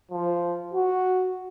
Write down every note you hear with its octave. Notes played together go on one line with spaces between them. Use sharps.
F3
F#4